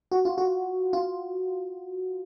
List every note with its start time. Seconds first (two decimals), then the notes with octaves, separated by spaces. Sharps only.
0.12 F#4
0.25 F4
0.38 F#4
0.93 F4